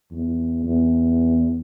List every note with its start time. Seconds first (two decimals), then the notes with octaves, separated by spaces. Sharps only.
0.12 E2
0.65 E2